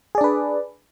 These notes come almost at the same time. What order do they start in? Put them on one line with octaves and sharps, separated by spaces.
G#4 D5 D4 B4